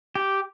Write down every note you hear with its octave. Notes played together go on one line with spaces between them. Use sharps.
G4